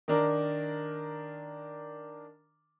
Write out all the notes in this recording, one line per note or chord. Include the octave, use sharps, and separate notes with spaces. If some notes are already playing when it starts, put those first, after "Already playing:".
D#3 D4 A#4